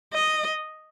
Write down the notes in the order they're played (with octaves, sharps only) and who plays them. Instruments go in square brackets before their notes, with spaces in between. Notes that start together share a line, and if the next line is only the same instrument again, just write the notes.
[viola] D#5